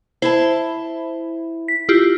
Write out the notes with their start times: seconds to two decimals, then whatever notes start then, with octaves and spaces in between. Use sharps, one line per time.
0.22 E4 C5 E5 A5
1.68 B6
1.89 E4 F4 G4